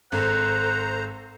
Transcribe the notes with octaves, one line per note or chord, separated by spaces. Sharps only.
G#1 A4 C5 F#5 A#5